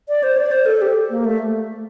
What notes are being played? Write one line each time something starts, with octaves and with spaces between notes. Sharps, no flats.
D5
C5
D5
C5
A4
G4
A#3
A3